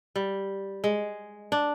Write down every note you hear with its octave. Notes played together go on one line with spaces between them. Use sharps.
G3
G#3
D4